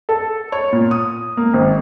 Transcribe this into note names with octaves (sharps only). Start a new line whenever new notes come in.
A4
C#5
A#2
D#6
A#3
G#1